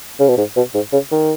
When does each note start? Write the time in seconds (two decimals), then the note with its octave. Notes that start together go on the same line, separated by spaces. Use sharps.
0.20 C#3
0.29 B2
0.37 G#2
0.56 B2
0.74 G#2
0.93 C#3
1.11 D#3